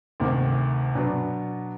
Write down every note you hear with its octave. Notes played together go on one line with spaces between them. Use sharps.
D2 C3 D#3
B2 F#3 B3 D4